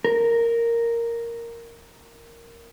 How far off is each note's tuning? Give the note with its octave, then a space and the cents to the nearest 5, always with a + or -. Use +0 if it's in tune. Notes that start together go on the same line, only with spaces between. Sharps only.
A#4 -5